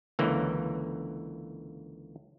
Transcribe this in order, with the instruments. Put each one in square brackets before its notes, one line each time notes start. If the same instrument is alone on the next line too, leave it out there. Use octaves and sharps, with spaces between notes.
[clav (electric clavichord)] C#2 D3 E3 A#3